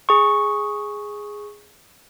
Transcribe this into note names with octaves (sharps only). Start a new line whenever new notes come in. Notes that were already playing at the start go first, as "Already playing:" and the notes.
G#4 C#6